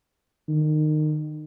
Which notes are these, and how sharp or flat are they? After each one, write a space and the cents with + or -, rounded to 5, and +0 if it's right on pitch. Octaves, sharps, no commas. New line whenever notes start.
D#3 -25